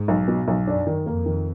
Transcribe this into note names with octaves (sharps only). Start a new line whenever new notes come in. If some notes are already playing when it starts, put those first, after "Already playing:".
Already playing: G#2
B1
B2
B1
F#2 D4
D#3
F2 A#3
D#3